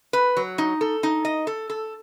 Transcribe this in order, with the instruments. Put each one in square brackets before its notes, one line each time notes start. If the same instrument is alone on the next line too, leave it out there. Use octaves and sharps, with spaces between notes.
[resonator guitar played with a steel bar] B4
F#3
D#4
A4
D#4
D#5
A4
A4